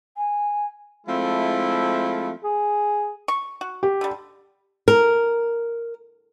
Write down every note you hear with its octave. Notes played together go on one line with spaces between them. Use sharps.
G#5
F3 G#3 A3 C4 E4
G#4
C#6
F#4
G4
D3 G3
A#4